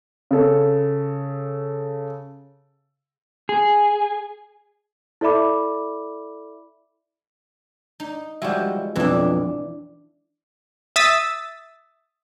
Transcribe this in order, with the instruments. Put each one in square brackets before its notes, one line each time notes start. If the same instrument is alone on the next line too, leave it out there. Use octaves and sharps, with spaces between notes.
[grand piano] C#3 A4
[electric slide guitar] G#4
[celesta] E4 A4 D5 E5 B5 D6
[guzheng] D#4
[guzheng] F3 G#3 [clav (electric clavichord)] G3 F#4 E5
[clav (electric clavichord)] B1 F2 [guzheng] E3 D4
[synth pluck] E5 D#6 E6 A6 B6